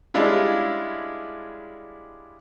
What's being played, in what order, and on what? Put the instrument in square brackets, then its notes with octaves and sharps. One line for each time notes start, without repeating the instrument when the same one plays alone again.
[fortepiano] G3 G#3 C#4 D4 E4 F4